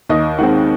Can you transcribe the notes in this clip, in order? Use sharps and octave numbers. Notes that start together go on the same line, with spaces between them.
D#2 D#5
D#3 G#3 C4 F#5